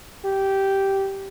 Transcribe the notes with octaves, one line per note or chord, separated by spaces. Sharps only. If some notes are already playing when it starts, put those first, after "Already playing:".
G4